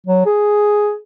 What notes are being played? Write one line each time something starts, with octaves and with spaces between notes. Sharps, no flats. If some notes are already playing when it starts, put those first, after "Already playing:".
F#3
G#4